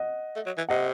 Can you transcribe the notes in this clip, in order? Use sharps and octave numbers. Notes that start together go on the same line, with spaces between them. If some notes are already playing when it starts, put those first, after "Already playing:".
Already playing: D#5 F#5
A3
F#3
E3
C3 D#5 F#5